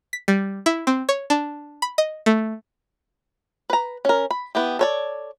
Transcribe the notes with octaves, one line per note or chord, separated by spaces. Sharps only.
B6
G3
E4
C4
C#5
D4
B5
D#5
A3
B4 A#5
C#4 A#4
B5
B3 E4 G4
A4 C#5 D5